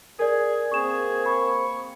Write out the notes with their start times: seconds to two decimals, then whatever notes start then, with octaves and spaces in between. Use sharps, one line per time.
0.19 G#4 A#4 D5
0.72 A#3 C4 G#4 C#6 E7
1.26 B5 C#6